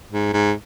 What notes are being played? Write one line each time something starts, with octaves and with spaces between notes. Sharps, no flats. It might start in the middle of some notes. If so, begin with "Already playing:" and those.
G#2
G#2